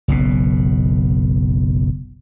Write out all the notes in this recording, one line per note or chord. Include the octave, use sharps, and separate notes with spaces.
F#1 B1 B2